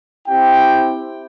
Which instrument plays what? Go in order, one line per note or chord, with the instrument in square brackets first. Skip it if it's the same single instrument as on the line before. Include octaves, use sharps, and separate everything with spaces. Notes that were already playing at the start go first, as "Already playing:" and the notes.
[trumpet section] C4 E4 G4 G5